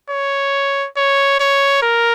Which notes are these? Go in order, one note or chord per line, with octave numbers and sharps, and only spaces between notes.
C#5
C#5
C#5
A#4